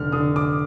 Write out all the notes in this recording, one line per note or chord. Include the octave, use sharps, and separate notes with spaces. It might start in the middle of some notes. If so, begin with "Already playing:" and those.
Already playing: F1 D3 F6
D3 D#6
D6